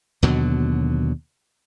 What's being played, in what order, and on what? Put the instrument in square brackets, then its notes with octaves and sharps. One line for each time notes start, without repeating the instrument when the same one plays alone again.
[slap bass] D#2 B2 D3 F#3